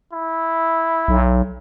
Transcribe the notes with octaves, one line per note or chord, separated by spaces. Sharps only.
E4
B1